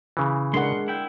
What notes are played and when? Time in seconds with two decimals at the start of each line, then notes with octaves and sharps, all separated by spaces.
0.17 C#3 E3
0.54 G#3 D4 A#4 F#5 C6
0.88 E4 G5